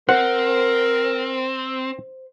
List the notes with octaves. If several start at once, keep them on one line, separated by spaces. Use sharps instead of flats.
C4 A#4 C5 F#5